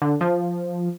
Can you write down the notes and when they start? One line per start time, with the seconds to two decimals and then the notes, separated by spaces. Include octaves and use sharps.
0.02 D3
0.21 F3